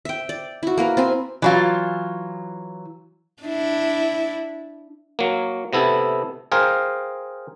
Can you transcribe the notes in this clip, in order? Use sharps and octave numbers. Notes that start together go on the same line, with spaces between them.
E5 G5
D5
E4 F#4
A#3 A#4 B4
C4 B4 G#5
E3 F#3 F4
D4 E4
F#3 A#3
C3 B3 E4 A4
G#4 A#4 C5 F5 G5